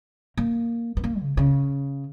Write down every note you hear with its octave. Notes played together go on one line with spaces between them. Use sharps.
A#3
B3
A#3
C#3
C#3